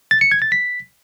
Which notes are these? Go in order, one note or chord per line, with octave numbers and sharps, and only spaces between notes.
A6
C#7
G#6
A6
B6